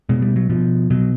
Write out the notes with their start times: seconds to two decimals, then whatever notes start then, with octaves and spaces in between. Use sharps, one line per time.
0.09 B2 G#3
0.22 G3
0.36 F#3
0.50 B2 F3
0.90 B2 F#3